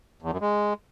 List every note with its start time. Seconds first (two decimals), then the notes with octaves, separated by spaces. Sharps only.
0.22 E2
0.32 F#2
0.41 G#3